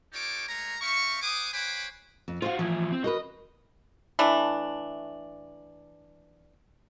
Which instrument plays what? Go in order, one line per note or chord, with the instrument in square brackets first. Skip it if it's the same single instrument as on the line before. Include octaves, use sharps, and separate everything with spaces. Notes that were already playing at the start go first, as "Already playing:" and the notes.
[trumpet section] D#4 F4 G4 A4 C#5 D6
G#3 A3 A#4 C#5 A#5
C4 E5 F5 C#6
C5 F#5 G#5 D6 D#6
C5 C#5 F#5 G#5 B5 D6
[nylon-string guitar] F2
[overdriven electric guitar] F4 F#4 [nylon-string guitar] C5 F5
[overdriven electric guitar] G#2 E3 [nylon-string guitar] F3
[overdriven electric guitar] C4
[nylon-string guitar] F#4 A#4 B4 [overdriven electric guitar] D#5
[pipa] E3 A3 D4